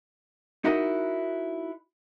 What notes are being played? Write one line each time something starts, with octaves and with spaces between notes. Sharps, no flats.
D#4 E4 F#4 A#4 D#5